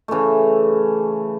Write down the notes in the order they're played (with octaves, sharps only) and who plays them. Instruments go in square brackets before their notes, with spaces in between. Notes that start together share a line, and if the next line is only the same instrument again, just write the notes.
[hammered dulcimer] C#3 E3 A3